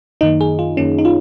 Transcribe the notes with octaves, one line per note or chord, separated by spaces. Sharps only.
F#2 D#3 A#3 D#4
G#4
F4
F#2 D#3 A#3 C#4
D#4
F4